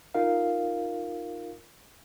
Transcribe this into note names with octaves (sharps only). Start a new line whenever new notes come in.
D#4 F4 A#4 F5